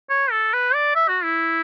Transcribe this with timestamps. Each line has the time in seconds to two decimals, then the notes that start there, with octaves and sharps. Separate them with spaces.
0.10 C#5
0.31 A4
0.53 B4
0.74 D5
0.95 E5
1.09 F#4
1.24 E4